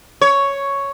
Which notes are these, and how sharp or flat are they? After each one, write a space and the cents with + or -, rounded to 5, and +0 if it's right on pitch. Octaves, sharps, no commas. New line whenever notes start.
C#5 +5